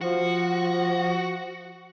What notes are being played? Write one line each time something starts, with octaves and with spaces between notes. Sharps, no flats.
F3 F#4